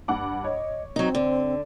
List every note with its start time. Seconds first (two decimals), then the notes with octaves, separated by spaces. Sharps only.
0.08 G2 F#5 D6
0.44 C#5 D#5
0.96 F#3 C4 D#4
1.15 D3